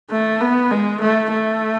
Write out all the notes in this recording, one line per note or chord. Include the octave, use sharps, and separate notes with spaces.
A3
B3
G#3
A3
A3